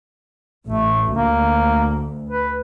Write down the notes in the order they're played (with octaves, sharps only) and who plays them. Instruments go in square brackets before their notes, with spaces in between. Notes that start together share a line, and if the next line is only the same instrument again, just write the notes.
[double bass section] A1 [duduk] A3
[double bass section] D2 [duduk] A#3
[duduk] B4